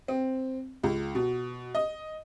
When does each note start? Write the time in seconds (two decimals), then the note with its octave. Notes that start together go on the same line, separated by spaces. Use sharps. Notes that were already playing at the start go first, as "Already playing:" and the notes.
0.08 C4
0.83 C#2
1.15 B2
1.75 D#5